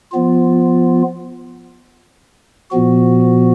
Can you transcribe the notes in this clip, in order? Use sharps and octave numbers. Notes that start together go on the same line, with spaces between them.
F3 B3 F4
A#2 F3 B3 F#4